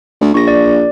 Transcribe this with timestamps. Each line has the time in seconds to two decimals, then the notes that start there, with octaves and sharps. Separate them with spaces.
0.21 D2
0.34 A#1 C#6 A#6
0.48 D5